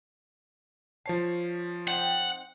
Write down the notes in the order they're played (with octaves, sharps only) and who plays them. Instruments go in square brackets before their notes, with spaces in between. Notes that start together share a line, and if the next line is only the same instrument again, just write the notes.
[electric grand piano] F3 C#5 C7 [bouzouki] A5
[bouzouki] C4 D#4 G5 [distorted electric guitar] F#5